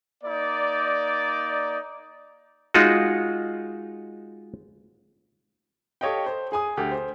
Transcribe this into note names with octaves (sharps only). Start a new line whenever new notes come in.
A#3 D#4 D5
G#3 D#4 F4 F#4
G4 A4 C#5 D#5 F5 G5
C5
G#4 G#5 D#6
D2 G4
C5